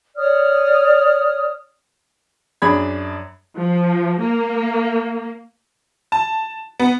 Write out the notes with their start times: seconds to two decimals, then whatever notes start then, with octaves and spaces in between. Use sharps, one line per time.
0.17 C#5 D5 D#6 F6
2.62 F#2 D4 G#4 B5 G#6
3.58 F3
4.20 A#3
6.12 A5
6.80 B3